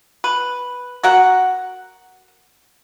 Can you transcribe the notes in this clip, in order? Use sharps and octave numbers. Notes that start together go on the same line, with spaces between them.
B4
F#4 A#4 F#5